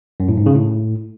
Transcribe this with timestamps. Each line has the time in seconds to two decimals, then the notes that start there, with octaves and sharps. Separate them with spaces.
0.20 F#2
0.29 A2
0.37 G#2
0.46 C#3
0.55 A2